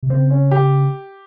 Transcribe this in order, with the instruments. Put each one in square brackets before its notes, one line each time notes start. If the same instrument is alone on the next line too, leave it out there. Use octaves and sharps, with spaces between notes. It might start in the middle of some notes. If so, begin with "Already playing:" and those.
[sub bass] C3
[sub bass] C#3 [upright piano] C4
[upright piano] C#4
G4